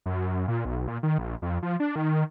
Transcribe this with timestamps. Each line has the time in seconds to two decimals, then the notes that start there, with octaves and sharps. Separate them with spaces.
0.06 F#2
0.48 A#2
0.65 B1
0.88 A#2
1.03 D#3
1.18 A#1
1.42 F2
1.63 F3
1.80 D4
1.96 D#3